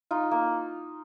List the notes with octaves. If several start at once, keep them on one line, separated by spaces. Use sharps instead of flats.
D#4 F4
A#3